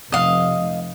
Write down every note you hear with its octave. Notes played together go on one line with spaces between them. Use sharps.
F1 D#5 F5